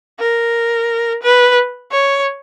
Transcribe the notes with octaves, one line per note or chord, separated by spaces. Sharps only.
A#4
B4
C#5